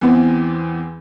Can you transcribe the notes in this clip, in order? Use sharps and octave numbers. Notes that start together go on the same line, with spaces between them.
E2 E3 B3 C4